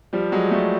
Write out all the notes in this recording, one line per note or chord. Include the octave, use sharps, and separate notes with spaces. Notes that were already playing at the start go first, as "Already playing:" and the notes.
F3 G3
F#3 G#3
G3 A3